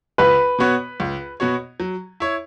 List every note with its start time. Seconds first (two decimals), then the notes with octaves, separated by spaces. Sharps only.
0.18 C#2 B4
0.58 B2 B3 F#4 C#5
1.00 C#2
1.40 B2 B3 F#4 C#5
1.80 F#3
2.20 E4 C#5